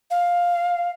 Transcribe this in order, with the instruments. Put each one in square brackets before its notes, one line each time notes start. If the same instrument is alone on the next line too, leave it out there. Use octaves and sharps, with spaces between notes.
[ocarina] F5